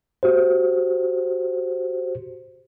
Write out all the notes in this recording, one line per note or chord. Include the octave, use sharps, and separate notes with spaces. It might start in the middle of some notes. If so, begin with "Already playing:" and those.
F#4 G4 C5